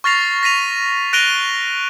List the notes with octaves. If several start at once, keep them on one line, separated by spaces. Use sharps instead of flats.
C#6 F6 A6 A#6 C7 F7
A#6 B6 D#7 F7
F#6 A#6 D7 D#7 F7 G7